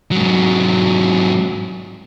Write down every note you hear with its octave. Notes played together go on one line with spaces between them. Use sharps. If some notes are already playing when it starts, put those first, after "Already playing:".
G#2 F#3